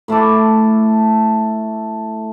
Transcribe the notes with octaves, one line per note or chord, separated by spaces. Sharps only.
A2 A3 A5 D6